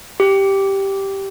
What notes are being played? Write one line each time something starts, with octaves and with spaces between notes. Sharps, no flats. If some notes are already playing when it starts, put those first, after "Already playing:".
G4